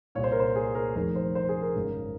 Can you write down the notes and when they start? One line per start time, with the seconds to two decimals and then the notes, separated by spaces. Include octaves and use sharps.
0.15 C2 A#2 C#5
0.24 C5
0.32 A#4
0.39 C5
0.55 G#4
0.75 A#4
0.95 F1 F2 D#3 A#4
1.15 C5
1.35 C5
1.49 G#4
1.62 A#4
1.75 G#1 F#2 C#3